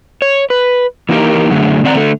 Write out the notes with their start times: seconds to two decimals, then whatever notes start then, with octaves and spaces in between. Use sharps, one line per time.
0.22 C#5
0.50 B4
1.09 E3 A#3 D#4 F4 G4 A#4
1.51 F#2 D3 A3 D4 G#4
1.84 D#3 C4 D5 F5 F#5 A#5
1.96 D3 A3